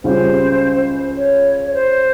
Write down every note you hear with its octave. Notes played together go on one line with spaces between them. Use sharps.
C#2 C#3 G3 C#4 F4 C5
C#5
C#5
C5